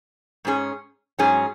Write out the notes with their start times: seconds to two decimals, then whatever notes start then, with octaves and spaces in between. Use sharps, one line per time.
0.45 G#2 F#3 C#4 G#4
1.19 G#2 F#3 C#4 G#4